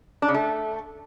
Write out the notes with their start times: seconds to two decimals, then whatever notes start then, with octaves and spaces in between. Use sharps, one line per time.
0.22 D4
0.28 C#3
0.34 A3